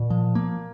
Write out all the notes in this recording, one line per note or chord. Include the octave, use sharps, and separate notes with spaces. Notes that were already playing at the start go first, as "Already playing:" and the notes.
Already playing: A#2
F3
A#3